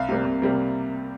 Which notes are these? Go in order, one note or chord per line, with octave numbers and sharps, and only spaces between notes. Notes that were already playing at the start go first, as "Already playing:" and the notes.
Already playing: C2 F5
C3 G3 A#3
C2
C3 G3 A#3